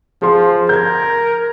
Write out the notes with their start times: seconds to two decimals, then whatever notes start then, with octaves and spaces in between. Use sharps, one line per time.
0.22 F3 G#4 C6
0.69 A#4 G6 G#6